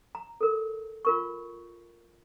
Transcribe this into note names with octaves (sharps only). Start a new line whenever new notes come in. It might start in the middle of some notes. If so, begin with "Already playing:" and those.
A#5
A4 A#4
F4 A#4 C#6